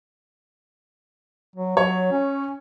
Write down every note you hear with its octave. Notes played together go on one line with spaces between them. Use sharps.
F#3
F#3 C#5
C#4